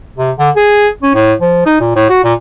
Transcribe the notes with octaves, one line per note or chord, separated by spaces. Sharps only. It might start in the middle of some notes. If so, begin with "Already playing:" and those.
C3
D3
G#4
C#4
A2
F3
D#4
A#2
A2
F#4
A#2